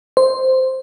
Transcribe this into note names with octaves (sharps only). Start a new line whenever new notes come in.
C5